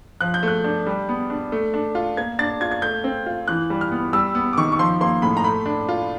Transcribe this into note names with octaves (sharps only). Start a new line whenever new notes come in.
F3 F#6
G6
A3 F#6
D4
G3
B3
D4
A3
D4
F4
A#3 G#6
D4 A6
F4 G#6
G#6
A3 G6
C4
F4
E3 F#6
G3
F6
B3
G3 E6
B3
D6
D#3 C#6
C#6
F3 C6
A#3 C6
A2 B5
A#5
A3 B5
D4
F4